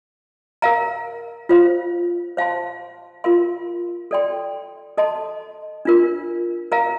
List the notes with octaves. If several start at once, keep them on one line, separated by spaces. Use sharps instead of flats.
A#4 F5 A#5
F4 C5 F5
C5 F5 A5 C6
F4 A#4 F5 C6
A4 D5 G5 C6
A4 D#5 A5 C6
D4 F4 A#4
A#4 F5 A#5